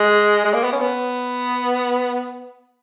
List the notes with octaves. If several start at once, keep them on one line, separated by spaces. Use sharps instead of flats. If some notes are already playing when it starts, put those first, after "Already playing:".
Already playing: G#3
G#3
A#3
B3
C#4
B3